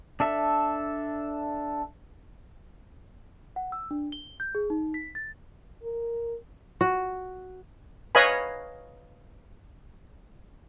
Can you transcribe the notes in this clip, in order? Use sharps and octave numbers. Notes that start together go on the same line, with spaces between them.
D4 A4 E5
F#5
E6
D4
G7
G6
G#4
D#4
B6
A6
A#4
F#4
B4 C#5 D#5 F5 G#5 B5